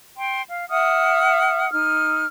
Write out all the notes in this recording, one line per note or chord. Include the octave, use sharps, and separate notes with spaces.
G5 C6
F5
E5 F#5 D#6 F6
D#4 F6